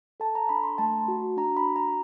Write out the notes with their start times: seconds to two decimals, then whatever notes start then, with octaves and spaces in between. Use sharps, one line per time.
0.20 A4 A5
0.35 A#5
0.49 D4 B5
0.64 C6
0.78 A3 A5
1.08 F#4
1.37 D4 A#5
1.57 B5
1.66 F#4
1.76 A#5